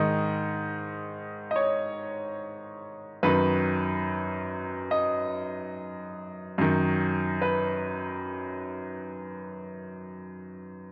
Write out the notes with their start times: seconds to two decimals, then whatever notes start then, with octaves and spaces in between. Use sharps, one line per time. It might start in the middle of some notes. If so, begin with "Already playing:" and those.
Already playing: G#2 D#3 D#5
1.51 D#5
1.56 C#5
3.23 F#2 D#3 B4
4.91 D#5
6.58 F#2 D#3
7.42 B4